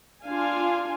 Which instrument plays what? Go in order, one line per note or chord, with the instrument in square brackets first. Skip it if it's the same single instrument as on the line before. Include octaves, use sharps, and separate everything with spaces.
[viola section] D4 F4 F5 G#5